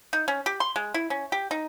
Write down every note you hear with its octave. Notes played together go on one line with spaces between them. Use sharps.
D#4
C#4
G4
C6
G#3
E4
C#4
G4
D#4